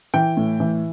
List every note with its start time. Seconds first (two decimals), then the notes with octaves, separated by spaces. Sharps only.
0.14 E3 G5
0.37 A2
0.60 E3